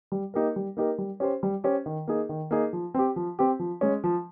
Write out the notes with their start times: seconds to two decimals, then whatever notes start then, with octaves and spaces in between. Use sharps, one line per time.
0.12 G3
0.34 A#3 D#4 G4 A#4
0.56 G3
0.77 A#3 D#4 G4 A#4
0.98 G3
1.20 C#4 G4 C5
1.43 G3
1.64 C#4 G4 C5
1.86 D#3
2.07 A#3 D#4 G#4
2.29 D#3
2.51 A#3 D#4 G#4
2.73 F3
2.94 C4 G4
3.16 F3
3.39 C4 G4
3.59 F3
3.81 G#3 C#4
4.04 F3